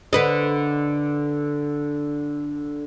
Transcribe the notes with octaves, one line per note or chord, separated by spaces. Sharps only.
D3 B4 D#5